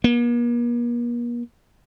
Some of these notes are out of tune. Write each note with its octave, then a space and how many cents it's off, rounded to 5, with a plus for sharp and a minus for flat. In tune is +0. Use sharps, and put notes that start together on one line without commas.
A#3 +45